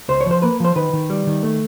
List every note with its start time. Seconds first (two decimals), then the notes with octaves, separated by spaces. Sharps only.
0.08 C#2 C5
0.21 F3 C#5
0.31 C5
0.42 A#3 B4
0.60 F3 C5
0.76 D#3 B4
0.93 D#3
1.10 G3
1.27 D#3
1.43 A3